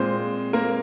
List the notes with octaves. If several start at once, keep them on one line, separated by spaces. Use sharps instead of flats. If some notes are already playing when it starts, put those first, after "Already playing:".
Already playing: A#2 G#3 C4 C5
A#3 A#4